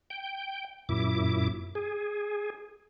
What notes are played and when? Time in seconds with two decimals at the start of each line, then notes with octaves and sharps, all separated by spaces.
0.10 G5
0.89 F#2 A#2 E4 D6
1.75 G#4